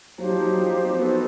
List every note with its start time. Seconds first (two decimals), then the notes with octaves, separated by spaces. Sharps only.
0.18 F#3 D#4 G4 C5 F5
0.29 F3
0.40 F#3
0.58 F3
0.84 C4
0.98 B3 D#4 F#4 A4 C5